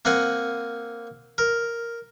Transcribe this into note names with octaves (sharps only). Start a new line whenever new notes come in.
A#3 C4 F#5 G#5
A#4